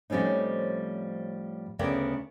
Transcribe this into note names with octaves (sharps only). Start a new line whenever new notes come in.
A2 F3 G3 C4 C#4 D#4
D2 C#3 B3 A#4 D5 G5